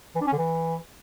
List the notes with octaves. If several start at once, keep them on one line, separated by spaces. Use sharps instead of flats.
E3
D4
C#4
D3
E3